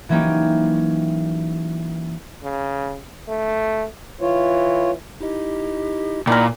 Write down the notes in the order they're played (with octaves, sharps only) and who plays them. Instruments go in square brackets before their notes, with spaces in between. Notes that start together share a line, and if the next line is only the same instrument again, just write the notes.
[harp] E3 F#3 A#3 C#4 D#4 G4
[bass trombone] C#3
A3
[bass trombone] E3 [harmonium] F4 C#5
[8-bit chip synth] D#4 E4 D#5 [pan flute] G4
[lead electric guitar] A#2 [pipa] D#3 A#4 [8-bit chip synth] E4 D5 F5 [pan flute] B5